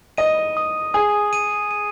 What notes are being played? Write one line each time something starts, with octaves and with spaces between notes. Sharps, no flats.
D#5 D#7
D#6
G#4 D#6
D#7
D#7